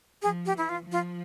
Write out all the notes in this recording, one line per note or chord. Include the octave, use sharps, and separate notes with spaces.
F3 G#4
G4
E3 E4
F4
F3
F4